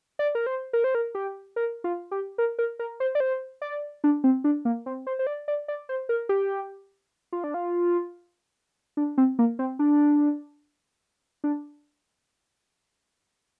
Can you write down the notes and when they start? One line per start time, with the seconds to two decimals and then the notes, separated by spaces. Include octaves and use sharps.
0.19 D5
0.35 A#4
0.46 C5
0.73 A#4
0.84 C5
0.95 A#4
1.15 G4
1.56 A#4
1.84 F4
2.11 G4
2.38 A#4
2.59 A#4
2.79 A#4
3.00 C5
3.15 D5
3.20 C5
3.62 D5
4.04 D4
4.24 C4
4.44 D4
4.65 A#3
4.86 C4
5.07 C5
5.19 C5
5.27 D5
5.48 D5
5.68 D5
5.89 C5
6.09 A#4
6.29 G4
7.32 F4
7.44 D4
7.54 F4
8.97 D4
9.18 C4
9.39 A#3
9.59 C4
9.79 D4
11.44 D4